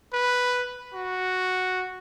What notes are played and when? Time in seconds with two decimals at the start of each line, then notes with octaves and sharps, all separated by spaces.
0.13 B4
0.94 F#4